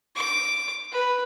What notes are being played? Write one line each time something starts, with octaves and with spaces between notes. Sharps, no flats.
D6
B4